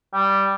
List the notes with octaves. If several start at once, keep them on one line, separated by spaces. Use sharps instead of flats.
G3